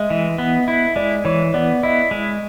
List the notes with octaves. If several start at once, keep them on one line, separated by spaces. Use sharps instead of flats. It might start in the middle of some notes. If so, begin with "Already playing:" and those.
Already playing: G#3 D#5 E5
E3
B3
E4
G#3 D5
E3 C#5
B3 D5
E4 D#5
G#3